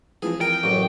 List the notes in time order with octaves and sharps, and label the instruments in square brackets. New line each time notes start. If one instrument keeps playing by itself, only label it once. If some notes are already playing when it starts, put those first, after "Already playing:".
[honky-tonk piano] E3 F3 C4 [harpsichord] G#4
[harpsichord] A#4 [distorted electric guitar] G5
[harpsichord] A1 F#2